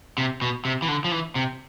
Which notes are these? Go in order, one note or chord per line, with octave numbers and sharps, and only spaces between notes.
C3
B2
C3
E3
D3
F3
E3
C3